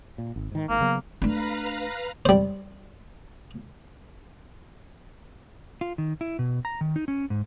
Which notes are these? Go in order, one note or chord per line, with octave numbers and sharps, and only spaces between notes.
A#2
G#1
G#2 D#3
G#1 G#2 A#3
C#3 F#3 B3
A3 D4 B4 F5 A#5
G3 C5
F4
D#3
E4
B2
A#5
D#3
D#4
C#4
G#2